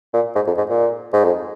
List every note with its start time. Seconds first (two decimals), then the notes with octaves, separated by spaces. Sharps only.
0.13 A#2
0.35 G#2
0.47 F2
0.57 G#2
0.69 A#2
1.13 G#2
1.24 F2